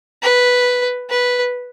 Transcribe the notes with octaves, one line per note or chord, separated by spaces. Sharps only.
B4
B4